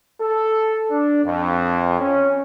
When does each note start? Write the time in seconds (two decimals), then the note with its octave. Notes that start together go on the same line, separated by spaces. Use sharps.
0.21 A4
0.91 D4
1.24 F2
2.00 C#4